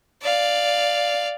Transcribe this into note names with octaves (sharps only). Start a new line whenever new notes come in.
D5 F5